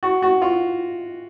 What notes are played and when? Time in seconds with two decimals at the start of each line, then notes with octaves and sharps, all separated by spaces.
0.03 F#4
0.22 F#4
0.42 F4